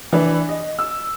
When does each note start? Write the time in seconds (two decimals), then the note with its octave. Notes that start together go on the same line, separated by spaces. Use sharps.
0.13 E3 D4 B4
0.49 D#5
0.79 E6